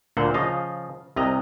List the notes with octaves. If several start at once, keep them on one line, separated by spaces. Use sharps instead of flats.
D2 A#2 D3 C5 F#5
C#3 F3 D#5 F5
C2 C3 D#5 A#5